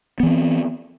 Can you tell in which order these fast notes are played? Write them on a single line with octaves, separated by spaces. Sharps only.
B3 E3 C4